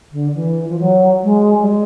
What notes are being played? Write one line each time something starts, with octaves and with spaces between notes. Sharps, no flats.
D3
E3
F3
F#3
G#3
G3
G#3